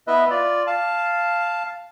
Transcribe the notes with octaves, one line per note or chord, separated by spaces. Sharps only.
B3 E4 B4 D#5 E5
F4 D5
F5 A5